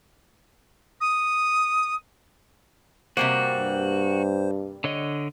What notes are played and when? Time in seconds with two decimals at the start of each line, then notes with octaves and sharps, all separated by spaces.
1.01 D#6
3.17 C3 G3 A#3 F#4 C5
3.54 G2
4.84 D3 C#5 D#5